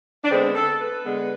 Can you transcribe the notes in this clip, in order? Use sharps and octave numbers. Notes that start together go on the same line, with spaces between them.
D4
D3 G#3 B3 C4
A4
B4
D3 G#3 B3